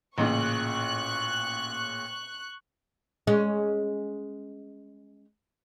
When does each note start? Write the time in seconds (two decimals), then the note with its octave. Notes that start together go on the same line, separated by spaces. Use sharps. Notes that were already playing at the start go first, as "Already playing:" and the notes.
0.18 A1 A#2 C#3 C#6 F#6
3.27 G#3 C#4